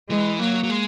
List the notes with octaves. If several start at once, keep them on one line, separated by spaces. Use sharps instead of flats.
E3 G#3
F#3 A#3
F#3
G#3